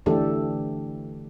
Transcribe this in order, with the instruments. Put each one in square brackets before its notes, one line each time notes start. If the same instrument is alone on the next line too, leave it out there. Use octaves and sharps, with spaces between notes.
[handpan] D3 E3 A3 D4 G4 A4